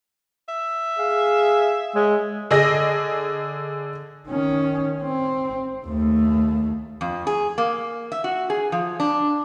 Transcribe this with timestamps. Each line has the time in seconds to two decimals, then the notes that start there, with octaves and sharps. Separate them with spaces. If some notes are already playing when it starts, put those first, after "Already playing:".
0.48 E5
0.99 G#4 F5
1.95 G#3 C#5
2.51 D3 G#4 D#5 A#6
4.27 D#3 C#4
5.03 C4
5.85 D#2 A3
7.01 F2
7.27 G#4
7.58 A#3
8.12 E5
8.24 F#4
8.50 G#4
8.72 F3
9.00 D4